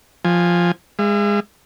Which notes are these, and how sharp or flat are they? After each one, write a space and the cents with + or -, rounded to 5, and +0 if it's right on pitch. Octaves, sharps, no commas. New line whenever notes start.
F3 +0 G#5 -15
G#3 -20 E5 +45